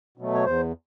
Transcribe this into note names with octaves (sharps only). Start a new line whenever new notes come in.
B2 F#3 A3
C#5
E2 C5